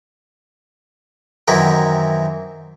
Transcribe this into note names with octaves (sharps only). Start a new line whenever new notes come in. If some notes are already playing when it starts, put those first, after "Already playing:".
F#2 D#3 E3 C4 E4 A#4